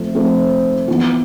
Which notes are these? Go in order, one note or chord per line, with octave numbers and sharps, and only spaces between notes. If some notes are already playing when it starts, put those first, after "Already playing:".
Already playing: F3 A3 C4
F3 A3 C4
E3 B3 F4